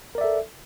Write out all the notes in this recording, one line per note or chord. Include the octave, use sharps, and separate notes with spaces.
A4 A#4 D5 E5